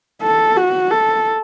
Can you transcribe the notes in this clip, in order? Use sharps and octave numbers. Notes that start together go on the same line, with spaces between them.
A4
F#4
A4